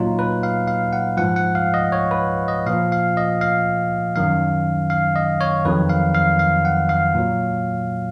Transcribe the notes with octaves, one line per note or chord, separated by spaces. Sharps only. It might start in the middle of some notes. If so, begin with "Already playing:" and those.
Already playing: A#2 F#3 D#4 F4
B4
F5
F5
F#5
G#2 F3 F#5
F#5
F5
D#5
C#5
B4
D#5
A#2 F3 F5
F5
D#5
F5
F#2 D#3 F#3 F5
F5
D#5
C#5
F2 D#3 F#3 B4
F5
F5
F5
F#5
F5
A#2 F#3